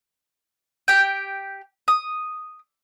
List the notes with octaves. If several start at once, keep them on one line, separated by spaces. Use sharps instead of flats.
G4 G5
D#6